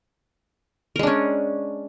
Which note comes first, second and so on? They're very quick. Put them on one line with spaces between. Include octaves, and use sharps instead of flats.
A#4 G#3 D4 C#4